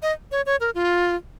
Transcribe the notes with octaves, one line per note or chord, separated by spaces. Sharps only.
D#5
C#5
C#5
A#4
F4